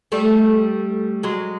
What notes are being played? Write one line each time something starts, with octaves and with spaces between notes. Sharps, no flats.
G3 A3
F#3 G#3